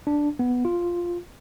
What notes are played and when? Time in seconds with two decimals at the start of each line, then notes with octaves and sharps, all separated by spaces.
0.07 D4
0.39 B3
0.65 F4